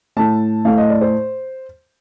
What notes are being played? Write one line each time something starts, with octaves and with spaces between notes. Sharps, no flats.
A2 A3 A5
A2 A3 F5
D#5
D5
C5